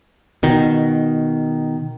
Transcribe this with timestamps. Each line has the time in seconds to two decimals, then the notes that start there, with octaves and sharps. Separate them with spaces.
0.43 B2 D#3